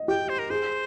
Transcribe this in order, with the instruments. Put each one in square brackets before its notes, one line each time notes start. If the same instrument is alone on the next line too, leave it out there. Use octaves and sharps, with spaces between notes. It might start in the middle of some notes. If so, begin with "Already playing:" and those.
Already playing: [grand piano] D#5
[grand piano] G4 [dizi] G5
[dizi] C5
A#4
[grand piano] G#4 [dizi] C5